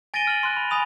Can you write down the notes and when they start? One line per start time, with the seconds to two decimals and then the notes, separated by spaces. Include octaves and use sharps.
0.14 G#5 A6 A#6 D7 D#7 G7
0.27 F6 F#7
0.43 C6 F#6
0.57 B5
0.71 G#5 B5 D#6 F7